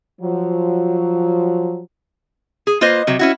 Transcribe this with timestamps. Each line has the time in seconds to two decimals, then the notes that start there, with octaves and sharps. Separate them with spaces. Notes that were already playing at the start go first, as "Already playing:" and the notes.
0.21 F3 F#3
2.67 G#4
2.81 A#3 F4 B4 C5 D#5
3.07 C3 F#3
3.19 C#4 E4 F#4